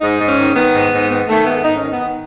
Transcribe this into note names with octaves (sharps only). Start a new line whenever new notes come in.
G#2 D#4
G#2
C#4
D#3
D#3 B3
G#2
G#2
D#3 B3
D#3 A3
G#2 B3
G#2 D#4
D#3 C#4
B3
D#3